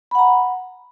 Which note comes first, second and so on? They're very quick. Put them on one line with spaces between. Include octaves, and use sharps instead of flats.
B5 F#5 A#5